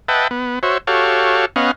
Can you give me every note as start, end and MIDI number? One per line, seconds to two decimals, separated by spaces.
0.09 0.28 71
0.09 0.28 75
0.09 0.28 76
0.09 0.28 78
0.09 0.28 79
0.09 0.28 81
0.31 0.59 59
0.63 0.78 66
0.63 0.78 72
0.63 0.78 73
0.63 0.78 76
0.87 1.45 66
0.87 1.45 67
0.87 1.45 69
0.87 1.45 73
0.87 1.45 77
1.56 1.71 59
1.56 1.71 61
1.56 1.71 75
1.56 1.71 77
1.56 1.71 78